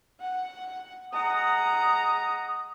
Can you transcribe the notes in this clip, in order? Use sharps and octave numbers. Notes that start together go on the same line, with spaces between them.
F#5
G#3 F#5 A#5 D#6